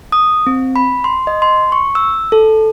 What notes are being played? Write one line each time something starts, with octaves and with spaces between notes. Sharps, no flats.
D#6
C4
B5
C6
D#5
C6
C#6
E6
A4